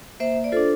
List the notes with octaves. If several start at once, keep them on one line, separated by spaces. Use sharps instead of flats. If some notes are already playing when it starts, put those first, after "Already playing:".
A#3 C5 E5
D5
D4 F4 A4 C5